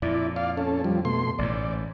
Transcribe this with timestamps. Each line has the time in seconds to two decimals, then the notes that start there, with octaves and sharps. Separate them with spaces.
0.02 F2 A#2 E4 D5
0.36 D5 F5
0.57 C#4 A4
0.84 F3 G3
1.05 B2 A3 C6
1.39 A1 G#2 D5